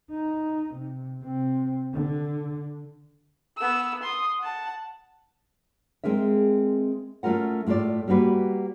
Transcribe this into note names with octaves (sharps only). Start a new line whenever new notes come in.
D#4
C3
C3 C4
D3
B3 E6
C6 D#6
F#5 A5
G#3 C4 G#4 A#4 E5
A3 C#4 F4 A#4 F#5
A2 A3 F4 A4 D5
G3 A#3 F#4 B4